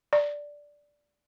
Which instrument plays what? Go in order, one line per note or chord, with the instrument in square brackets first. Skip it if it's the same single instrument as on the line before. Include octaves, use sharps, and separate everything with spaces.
[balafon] D5